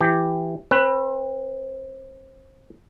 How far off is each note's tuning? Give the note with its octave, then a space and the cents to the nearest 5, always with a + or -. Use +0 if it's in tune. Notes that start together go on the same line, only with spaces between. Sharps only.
E3 +15 G4 +0
C4 +30 B4 +0